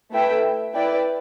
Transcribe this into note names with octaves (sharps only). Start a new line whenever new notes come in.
A3 E4 B4 E5 G5
E4 B4 D5 G5